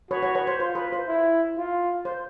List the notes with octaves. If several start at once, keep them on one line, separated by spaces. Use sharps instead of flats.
F#4 B4 C#5
B4 C#5
B4 C#5
C5
F4 C5
B4
C5
E4
F4
C5